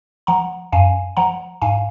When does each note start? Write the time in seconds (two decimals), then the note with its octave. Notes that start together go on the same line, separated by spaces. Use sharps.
0.27 F3 F#5 A#5
0.72 F#2 F5 G#5
1.17 F3 F#5 A#5
1.62 G#2 F5 G#5